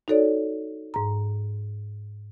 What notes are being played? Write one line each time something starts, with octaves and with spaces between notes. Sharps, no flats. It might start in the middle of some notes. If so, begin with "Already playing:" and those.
D#4 F#4 A4 C#5 D5
G#2 A#5